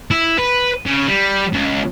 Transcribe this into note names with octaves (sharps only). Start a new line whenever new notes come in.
E4
B4
C#3
G3
C#2